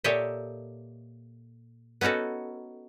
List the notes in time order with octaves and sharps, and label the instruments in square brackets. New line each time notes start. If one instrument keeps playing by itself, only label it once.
[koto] A#2 G4 A4 C#5 D#5 E5
B3 C#4 D#4 F#4 A4